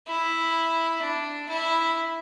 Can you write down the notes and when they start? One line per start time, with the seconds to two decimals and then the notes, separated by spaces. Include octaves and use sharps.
0.08 E4
1.02 D4
1.49 E4